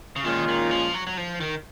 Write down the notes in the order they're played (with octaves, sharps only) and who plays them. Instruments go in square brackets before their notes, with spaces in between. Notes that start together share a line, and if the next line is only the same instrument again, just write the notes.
[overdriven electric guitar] C#3
[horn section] A#2 G#3 C#4 F4 [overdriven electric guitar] D#3
[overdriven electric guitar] D#3
F3
F#3
F#3
F3
D#3